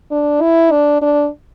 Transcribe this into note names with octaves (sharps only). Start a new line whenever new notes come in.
D4
E4
D4
D4